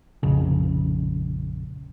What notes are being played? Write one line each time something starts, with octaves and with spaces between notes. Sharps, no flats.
A#1 F2 C#3